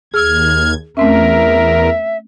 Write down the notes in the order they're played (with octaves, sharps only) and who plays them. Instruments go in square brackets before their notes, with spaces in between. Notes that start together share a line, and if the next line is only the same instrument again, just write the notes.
[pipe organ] D#2 G#6 [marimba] G#4 E6 [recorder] F6
[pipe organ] E2 A#4 [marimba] A3 C4 C#4 [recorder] E5